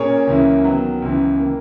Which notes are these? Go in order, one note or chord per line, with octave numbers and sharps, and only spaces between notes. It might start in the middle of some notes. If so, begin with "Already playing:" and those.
Already playing: A#2 A#3 C#4 G#4 C#5
C#2 C#3 E3 A#3 E4
D#3 F#3 B3
C#2 C#3 E3
D#3 A#3